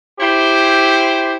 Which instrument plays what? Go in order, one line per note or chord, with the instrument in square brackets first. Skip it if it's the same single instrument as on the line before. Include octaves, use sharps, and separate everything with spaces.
[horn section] E4 G4 C5